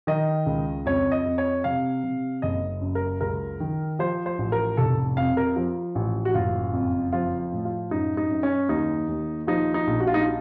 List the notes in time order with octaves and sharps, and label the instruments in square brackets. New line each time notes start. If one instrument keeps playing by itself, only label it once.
[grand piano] D#3 D#5
C#2
F2 C#5
D#5
F2
C#5
C3 F5
C3
F#1 D#5
F#2
A#4
C#2 A#4
D#3
F3 C5
C5
A1
A#4
F1 A4
F2 F5
A#4
F3
A1
F#4
F#1 F4
F2
F3 F4
A2
F4
F#2 D#4
D#4
F#2
C#4
D#2 D#4
D#2
F3 D#4
D#4
A#1
F#4
F4
D#4
F4